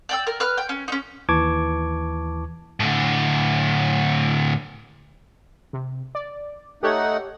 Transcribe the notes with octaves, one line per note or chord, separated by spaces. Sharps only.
D5 G5 E6
A#4
B4 F6
G5
C#4
C#4 D#4
D#2 E3 A5 C#6 D6 G#6
A2 D3
C3
D5
A3 D#4 G4 A4 C#5 F#5